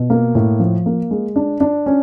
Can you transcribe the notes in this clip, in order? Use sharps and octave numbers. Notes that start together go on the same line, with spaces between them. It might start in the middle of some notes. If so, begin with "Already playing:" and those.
Already playing: B2
A#3
A2
F3
A#3
G#3
D4
D4
C#4